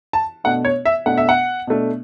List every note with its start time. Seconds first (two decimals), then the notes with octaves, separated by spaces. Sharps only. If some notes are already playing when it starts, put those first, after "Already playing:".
0.13 A5
0.44 B2 A3 D4 F#5
0.65 C#5
0.85 E5
1.06 B2 A3 D4 F#5
1.17 E5
1.29 F#5
1.67 B2 A3 D4